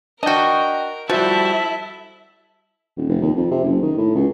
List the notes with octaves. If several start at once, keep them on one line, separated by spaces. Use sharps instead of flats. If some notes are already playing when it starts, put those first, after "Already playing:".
D4 F#4 A#4 D#5 G5
F3 G3 E4 F#4 A4 E5
D#1
F1
D#2
F2
C3
F#1
D#3
A2
C#2